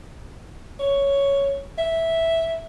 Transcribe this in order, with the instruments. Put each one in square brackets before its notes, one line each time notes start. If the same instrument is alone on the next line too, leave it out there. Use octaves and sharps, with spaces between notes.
[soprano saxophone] C#5
E5